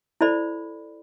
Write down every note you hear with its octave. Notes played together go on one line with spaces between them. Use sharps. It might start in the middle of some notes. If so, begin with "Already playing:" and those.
E4 A4 C5 D5 B5